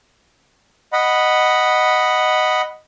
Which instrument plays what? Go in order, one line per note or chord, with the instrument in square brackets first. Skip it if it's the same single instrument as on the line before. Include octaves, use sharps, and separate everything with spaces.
[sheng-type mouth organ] D#5 F#5 B5